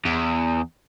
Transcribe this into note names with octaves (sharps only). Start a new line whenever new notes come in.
E2